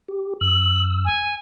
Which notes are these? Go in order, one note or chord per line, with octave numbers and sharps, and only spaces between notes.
G4
F#2 E6 F#7
G#5